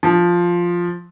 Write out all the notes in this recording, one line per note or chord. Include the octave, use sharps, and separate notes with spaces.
F3